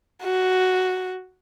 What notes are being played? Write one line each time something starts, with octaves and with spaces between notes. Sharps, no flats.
F#4